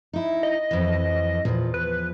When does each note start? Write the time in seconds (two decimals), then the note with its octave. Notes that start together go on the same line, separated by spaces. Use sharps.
0.13 D#4 E4
0.43 D#5
0.71 F2 E3
1.45 E2 A#2 F3
1.74 B4